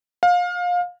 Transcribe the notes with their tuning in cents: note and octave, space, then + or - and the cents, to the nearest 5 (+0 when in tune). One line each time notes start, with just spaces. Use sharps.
F5 +25